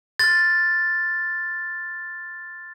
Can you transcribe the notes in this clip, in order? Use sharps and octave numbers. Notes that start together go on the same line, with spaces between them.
C6 F6 A6